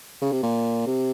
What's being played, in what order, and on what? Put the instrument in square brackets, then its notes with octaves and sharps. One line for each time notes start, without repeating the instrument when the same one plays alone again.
[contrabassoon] C#3
C3
A#2
C3